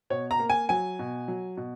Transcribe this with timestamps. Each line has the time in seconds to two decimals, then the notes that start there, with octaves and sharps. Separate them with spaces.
0.10 B2 C#5
0.31 A#5
0.39 A#3
0.50 G#5
0.69 F#3 G#5
0.99 B2
1.28 F#3
1.57 B2